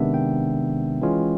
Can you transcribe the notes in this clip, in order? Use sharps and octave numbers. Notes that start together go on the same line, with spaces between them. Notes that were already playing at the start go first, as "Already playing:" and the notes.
Already playing: C3 D#3 G#3 B3 D4 E5
G5
E3 G#3 C#4 F4